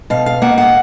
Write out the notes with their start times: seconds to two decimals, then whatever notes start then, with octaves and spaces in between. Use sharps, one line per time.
0.10 B2 F5
0.26 F5
0.42 A#3 F#5
0.58 F#5